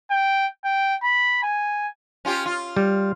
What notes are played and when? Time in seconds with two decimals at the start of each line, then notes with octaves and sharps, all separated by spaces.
0.11 G5
0.65 G5
1.03 B5
1.43 G#5
2.25 C#4 F4 G4
2.46 F4
2.76 G3